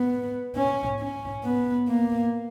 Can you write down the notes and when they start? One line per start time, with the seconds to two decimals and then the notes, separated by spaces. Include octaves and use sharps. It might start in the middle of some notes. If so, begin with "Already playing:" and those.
Already playing: B3
0.56 C#4
1.00 C#4
1.43 B3
1.88 A#3